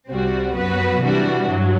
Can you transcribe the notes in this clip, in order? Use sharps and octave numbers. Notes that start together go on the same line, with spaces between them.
C2 C3 G3 C4 F#4
F#2 F#3 B3 F#4 B4
C3 E3 G3 D4 F#4
G2 F#3